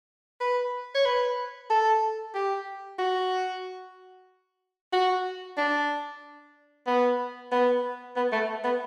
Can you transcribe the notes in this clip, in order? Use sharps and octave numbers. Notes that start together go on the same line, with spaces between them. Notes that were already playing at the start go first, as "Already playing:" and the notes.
B4
C#5
B4
A4
G4
F#4
F#4
D4
B3
B3
B3
A3
B3